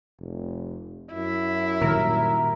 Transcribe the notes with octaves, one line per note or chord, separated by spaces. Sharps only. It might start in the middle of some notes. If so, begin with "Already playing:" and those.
F1
F#2 E4
A#2 D#3 G3 A#4